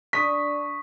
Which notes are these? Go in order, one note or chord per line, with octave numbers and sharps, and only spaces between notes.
D4 C#6 D#6 B6